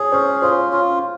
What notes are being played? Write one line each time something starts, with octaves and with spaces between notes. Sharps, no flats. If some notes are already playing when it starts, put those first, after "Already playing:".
Already playing: G#4 C#5
C#4 C5
F4 C5
F4